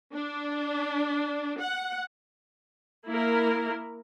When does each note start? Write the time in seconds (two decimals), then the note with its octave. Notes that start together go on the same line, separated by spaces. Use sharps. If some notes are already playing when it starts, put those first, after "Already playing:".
0.14 D4
1.60 F#5
3.05 A#3 E4 A#4